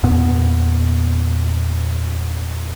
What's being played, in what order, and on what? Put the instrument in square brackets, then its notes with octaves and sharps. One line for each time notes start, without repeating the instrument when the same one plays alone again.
[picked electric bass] E2 A#2 B3